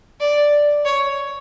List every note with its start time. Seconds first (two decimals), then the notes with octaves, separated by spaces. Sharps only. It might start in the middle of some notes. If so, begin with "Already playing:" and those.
0.21 D5
0.85 C#5